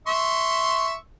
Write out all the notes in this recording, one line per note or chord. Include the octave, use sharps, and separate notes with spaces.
E5 C6 C#6